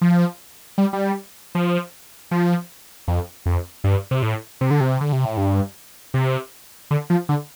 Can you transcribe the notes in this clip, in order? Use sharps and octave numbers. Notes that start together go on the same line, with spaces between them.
F3
G3
G3
F3
F3
F2
F2
G2
C3
A2
C3
D3
C3
D3
C3
A2
G2
C3
D3
F3
D3